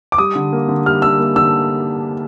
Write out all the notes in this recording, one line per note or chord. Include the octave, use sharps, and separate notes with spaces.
D6
G3 D#6
D3
A#3
D3
G3 F6
D3 E6
A#3
D3 E6